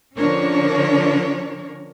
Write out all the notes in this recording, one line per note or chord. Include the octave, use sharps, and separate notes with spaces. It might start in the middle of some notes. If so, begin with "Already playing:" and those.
D3 F3 C#4 D4 A#4 C#5